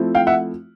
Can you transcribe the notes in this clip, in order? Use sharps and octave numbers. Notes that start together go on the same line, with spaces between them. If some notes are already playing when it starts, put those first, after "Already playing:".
Already playing: F3 A3 C4 E4
F5 G5
E5 F#5